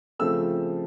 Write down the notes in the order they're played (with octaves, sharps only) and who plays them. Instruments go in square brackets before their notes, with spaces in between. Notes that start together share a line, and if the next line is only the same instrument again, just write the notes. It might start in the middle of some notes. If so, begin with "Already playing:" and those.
[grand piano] C#3 F3 A3 C4 E6